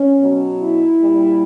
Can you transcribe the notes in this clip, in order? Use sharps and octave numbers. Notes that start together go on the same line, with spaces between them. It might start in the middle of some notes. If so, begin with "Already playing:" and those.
Already playing: C#4
B2 F#3
E4
A#2 G3